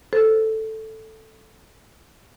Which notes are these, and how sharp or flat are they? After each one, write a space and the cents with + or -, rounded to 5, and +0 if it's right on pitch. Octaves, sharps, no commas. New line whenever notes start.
A4 +0 C5 +0